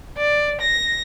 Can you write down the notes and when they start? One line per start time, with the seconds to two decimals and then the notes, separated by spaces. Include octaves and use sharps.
0.17 D5
0.61 A#6